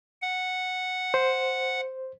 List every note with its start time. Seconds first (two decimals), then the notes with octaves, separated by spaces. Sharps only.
0.22 F#5
1.14 C5